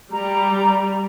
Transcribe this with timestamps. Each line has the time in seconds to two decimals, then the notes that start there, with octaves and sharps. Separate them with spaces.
0.12 G3 A#5